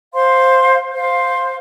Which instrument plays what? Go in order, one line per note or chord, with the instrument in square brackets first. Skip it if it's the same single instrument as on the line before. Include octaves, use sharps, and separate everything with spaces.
[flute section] C5 F5 C6
C5 F5 C6